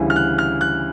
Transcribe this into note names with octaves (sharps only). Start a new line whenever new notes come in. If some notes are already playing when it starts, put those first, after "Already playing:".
Already playing: D2 C#3 E3 G3
F6
F#6
F6
F#6